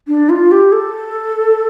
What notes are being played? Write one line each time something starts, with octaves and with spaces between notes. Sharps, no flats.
D4
F4
G4
A4